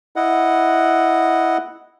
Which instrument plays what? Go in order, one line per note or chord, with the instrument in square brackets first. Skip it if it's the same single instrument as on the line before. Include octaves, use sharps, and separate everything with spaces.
[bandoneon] E4 D#5 F#5